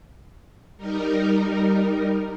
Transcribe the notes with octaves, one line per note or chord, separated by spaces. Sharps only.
G3 D#4 A#4